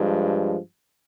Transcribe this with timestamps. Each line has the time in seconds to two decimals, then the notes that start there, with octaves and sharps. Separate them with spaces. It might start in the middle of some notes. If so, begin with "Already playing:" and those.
Already playing: G2 F3 G#3